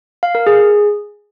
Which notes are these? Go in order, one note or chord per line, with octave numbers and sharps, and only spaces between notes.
F5
A#4
G#4